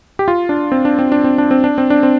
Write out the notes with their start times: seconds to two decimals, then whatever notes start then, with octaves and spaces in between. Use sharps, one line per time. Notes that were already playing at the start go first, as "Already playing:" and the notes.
0.19 G4
0.28 F4
0.49 D4
0.72 C4
0.85 D4
0.99 C4
1.12 D4
1.24 C4
1.38 D4
1.51 C4
1.64 D4
1.78 C4
1.90 D4
2.03 C4